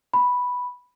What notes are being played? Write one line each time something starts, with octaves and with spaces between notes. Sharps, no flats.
B5